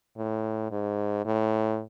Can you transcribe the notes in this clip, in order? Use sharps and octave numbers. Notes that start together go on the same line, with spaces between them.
A2
G#2
A2